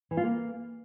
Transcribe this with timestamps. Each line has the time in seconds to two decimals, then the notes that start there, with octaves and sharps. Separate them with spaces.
0.11 E3
0.17 F4
0.24 A#3